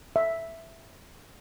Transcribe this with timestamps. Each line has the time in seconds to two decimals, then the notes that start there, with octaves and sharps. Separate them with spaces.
0.16 E5